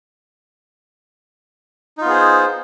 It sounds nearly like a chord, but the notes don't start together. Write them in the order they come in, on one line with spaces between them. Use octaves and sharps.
D#4 F4 B3 G#4 C5